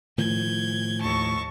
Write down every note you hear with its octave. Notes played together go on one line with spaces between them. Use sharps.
A2 D#3 F3 G6 G#6
D#2 A5 C#6